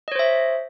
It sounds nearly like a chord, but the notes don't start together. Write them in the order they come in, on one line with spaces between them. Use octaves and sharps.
D#5 C#5 C5 E5